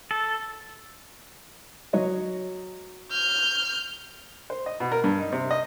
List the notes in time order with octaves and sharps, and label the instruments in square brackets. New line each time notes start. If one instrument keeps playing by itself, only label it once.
[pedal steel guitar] A4
[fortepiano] F#3 C#5 D#5
[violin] F6 G6
[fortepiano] C5
D#5
B2
A#4
G2
D#4
C3
D#5